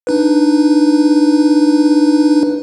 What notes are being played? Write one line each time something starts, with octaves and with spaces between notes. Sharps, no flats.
D4 D#4 B4